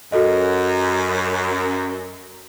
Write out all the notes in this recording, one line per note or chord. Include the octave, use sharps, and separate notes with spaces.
F#2 F#4 A4 D#5